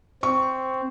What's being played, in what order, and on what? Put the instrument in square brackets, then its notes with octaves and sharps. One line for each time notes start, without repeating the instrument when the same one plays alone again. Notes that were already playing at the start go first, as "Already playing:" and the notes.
[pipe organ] C4 [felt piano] C#6